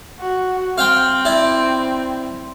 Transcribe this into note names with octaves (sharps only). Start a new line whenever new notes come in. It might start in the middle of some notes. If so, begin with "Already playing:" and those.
F#4
C4 F5 G5
E4 D5